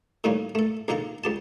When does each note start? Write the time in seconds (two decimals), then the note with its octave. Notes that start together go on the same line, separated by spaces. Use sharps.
0.24 A2 D#3 G3 A#3 C#4
0.55 A3 A4
0.88 A#1 D#3 A#3 A4 A#5
1.24 C#2 G4 A5